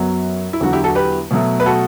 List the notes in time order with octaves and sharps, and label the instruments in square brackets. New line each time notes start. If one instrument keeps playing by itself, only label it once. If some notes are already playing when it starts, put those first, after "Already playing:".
Already playing: [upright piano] F#2 F#3 B3
[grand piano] E4
[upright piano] E2 D3 F#3 [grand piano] F#4
[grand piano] E4 G4
F#4 A4
G4 B4
[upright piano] B2 F#3 A3
[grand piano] B4
F#4 A4